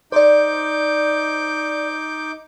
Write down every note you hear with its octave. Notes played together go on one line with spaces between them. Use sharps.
D#4 C5 D5 D6 G6